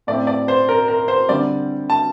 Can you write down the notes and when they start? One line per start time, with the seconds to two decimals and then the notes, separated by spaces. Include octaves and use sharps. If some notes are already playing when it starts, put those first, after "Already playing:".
0.07 A2 A3 C4 D5
0.27 D5
0.48 C5
0.69 A#4
0.88 A#4
1.08 C5
1.29 D3 G3 C4 D5
1.90 A5